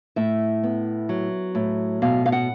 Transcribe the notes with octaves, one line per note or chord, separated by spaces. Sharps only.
A2 E5
B3
F#3
A2
B2 F5
F5
F#5